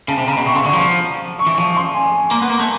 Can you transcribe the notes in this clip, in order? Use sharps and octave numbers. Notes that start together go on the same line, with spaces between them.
C#3 A5
C3
C#3 A#5
B5
B2
C3 C#6
C#3 C6
D3 C#6
F3
C#6
E3
F3 C#6
C6
G#5
A#3
B3
A#3
A3